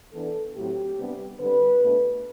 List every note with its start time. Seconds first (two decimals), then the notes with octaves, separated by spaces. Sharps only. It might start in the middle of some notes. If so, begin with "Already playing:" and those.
0.13 E3 B3 D4 A4
0.55 A2 F#3 C4 G4
0.97 C3 G3 B3 D4
1.39 D3 G3 C4 B4
1.81 B2 A3 D4